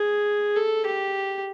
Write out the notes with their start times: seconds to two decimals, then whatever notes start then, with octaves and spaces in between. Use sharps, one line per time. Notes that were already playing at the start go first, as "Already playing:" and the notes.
Already playing: G#4
0.56 A4
0.85 G4